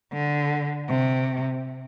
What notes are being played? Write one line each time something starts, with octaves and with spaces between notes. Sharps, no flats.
D3
C3